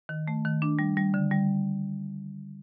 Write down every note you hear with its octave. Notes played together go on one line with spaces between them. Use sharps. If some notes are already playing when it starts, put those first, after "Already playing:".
D#3
A3
D#3
D4
G3
G3
D3
G3